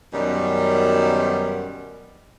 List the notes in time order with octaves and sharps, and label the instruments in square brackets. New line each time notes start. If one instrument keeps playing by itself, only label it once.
[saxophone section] F#2 B2 D#3 G3